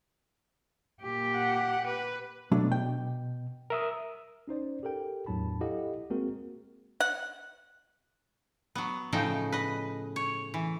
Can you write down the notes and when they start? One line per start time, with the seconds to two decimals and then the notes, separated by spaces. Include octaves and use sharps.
1.02 A#2 G4
1.34 F#5
1.87 B4
2.52 B2 F#3 A3 D4
2.72 G5
3.70 A#4 E5 D#6
4.48 C#4 D#4 C5 D5
4.83 G4 A4 A#4 G5
5.26 E2 A2 F#3 D4 A5 B5
5.61 E4 G4 A4 D#5 F5 F#5
6.10 G#3 A#3 C4 F#4 G#4 A#4
7.00 F#5
8.75 F#3 B3
9.12 A2 C#3 F3 D#4 G5
9.52 B4 D#5
10.16 C#5
10.54 E3